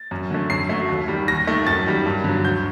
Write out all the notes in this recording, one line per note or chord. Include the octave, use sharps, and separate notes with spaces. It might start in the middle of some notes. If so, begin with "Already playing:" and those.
Already playing: A6
F#2
D3 A3
F#2 C7
F#3 A3
D#2
D#3 G3
D#2 A#6
D#3 A3
F#2 A6
D#3 G3
G2
D3 F#3
D2 G6